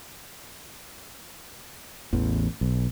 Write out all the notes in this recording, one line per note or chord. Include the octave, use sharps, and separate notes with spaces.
A1 E2
B1